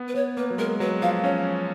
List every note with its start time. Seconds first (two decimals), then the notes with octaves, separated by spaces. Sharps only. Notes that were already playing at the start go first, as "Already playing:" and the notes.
Already playing: B3
0.08 B4
0.15 B3 C#5
0.37 A#3 B4
0.50 F#3
0.58 G#3 A#4
0.80 F#3 B4
1.02 F3 F5
1.24 C#4 C#5